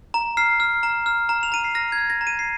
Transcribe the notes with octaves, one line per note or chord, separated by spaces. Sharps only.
A#5
F6 C7
F6
A#5
F6
A#5
F7
A#5 D#7
C7
F6 A#6
G#6
F6
A#6
A#5
D#7
C7